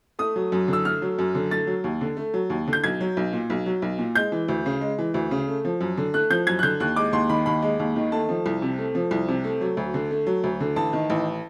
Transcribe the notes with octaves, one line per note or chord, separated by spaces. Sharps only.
A3 D#6
F#3
F#2
D3 E6
A3 F6
F#3
F#2
D3
A3 A6
F#3
D#2
D3
A3
F#3
D#2
D3
G6
B1 G#6
F#3
B1
A#2
B1
F#3
B1
A#2
G#3 G6
E3
D2
C#3
G#3
E3
D2
C#3
A3
F3
F#2
D3
A3 F#6
F3 G6
F#2 G#6
F#6
D3 G6
D#2 F#6
G#3 D6
D#2 C6
D#3 B5
D#2 B5
G#3
D#2
D#3
A3 A5
F3
C2
C3
A3
F3
C2
C3
A3
F#3
D2
D3
A3
F#3
D2
D3
A1 A5
D#3
A1